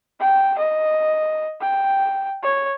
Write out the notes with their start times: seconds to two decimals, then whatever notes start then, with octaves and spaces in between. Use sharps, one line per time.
0.20 G5
0.58 D#5
1.61 G5
2.43 C#5